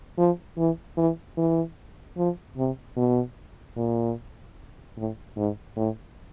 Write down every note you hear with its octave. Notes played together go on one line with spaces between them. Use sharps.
F3
E3
E3
E3
F3
C3
B2
A#2
A2
G#2
A2